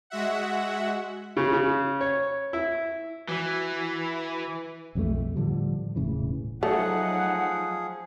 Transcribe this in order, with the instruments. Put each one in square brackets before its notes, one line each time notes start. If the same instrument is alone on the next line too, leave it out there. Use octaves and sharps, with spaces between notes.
[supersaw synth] G#3 F#4 E5 F#5
[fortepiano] C#3
C#3
C#5
E4
[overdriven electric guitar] E3 [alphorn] F#4
[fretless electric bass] B1 F2 E3 A3
A2 D3 F3 G3
E1 A2 C#3 E3
[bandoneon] F3 G#4 [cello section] F#3 D#4 [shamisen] A3 [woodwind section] F#5